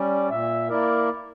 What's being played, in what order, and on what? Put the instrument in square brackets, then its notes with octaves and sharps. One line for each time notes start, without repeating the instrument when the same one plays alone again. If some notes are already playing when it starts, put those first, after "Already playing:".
Already playing: [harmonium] G3 C#4 [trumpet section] D5
[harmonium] A#2 [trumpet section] E5
[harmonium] A#3 E4 A#4 [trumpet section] D5